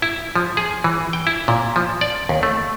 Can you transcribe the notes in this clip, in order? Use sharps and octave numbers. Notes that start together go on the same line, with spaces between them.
E4
F3
G#4
E3
G5
E4
A#2
F3
D5
D#2
A3